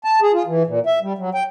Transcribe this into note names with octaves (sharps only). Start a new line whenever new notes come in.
A5
G#4
F4
E3
A#2
E5
G3
F#3
G5